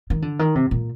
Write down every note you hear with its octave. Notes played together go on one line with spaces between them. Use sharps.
D#3
D3
D#3
C3
A#2